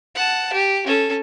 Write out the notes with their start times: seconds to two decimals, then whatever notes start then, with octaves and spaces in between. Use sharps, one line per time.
0.15 F#5 A5
0.53 G4
0.86 C#4 A4